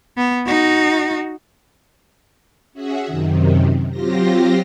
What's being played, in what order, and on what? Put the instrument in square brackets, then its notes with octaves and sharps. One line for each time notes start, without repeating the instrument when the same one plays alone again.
[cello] B3
D#4 F#4
[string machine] C#4 F#4 G#4 E5 F#5
F#2 C3 D#3
F#3 C4 F4 G4 C5 A#6